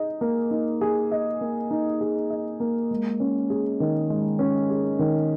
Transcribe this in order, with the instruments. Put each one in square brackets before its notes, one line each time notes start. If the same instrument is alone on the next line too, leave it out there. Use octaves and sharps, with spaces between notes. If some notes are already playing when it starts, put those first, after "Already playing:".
Already playing: [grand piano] D#4 G#4 D#5
A#3
D#4
G#4
D#5
A#3
D#4
G#4
D#5
A#3
G#3
C#4
G#4
D#3
G#3
C#4
G#4
D#3